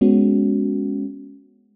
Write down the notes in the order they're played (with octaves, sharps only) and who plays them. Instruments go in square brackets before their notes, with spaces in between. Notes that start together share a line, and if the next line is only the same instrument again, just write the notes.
[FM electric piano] G#3 B3 C#4 F#4